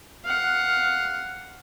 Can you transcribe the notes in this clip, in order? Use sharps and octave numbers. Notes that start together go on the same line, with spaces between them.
F5 F#5